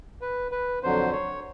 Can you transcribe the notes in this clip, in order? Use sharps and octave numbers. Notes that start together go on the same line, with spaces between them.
B4
B4
F2 D3 F#3 C5
C#5